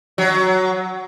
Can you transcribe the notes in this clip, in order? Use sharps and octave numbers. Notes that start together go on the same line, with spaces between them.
F#3